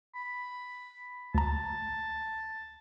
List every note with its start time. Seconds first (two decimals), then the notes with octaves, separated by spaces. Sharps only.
0.15 B5
1.35 D2 A5 A#5